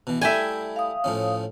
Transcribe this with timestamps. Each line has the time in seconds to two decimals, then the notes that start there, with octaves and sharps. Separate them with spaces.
0.07 B2 E3
0.21 G3 A3 E4 E5 G5 G#5
0.76 F5 D#6
1.04 A2 F3 C#4